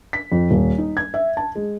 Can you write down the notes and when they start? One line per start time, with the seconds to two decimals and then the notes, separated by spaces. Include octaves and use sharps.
0.13 B6
0.32 F2
0.51 D#1
0.78 D#4
0.97 G#6
1.14 E5
1.37 A5
1.55 G#3